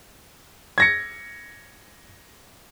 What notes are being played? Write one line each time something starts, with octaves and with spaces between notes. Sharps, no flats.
G#6 A#6 C#7